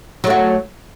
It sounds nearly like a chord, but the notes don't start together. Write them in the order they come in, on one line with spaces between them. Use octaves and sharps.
F#3 A3 F#4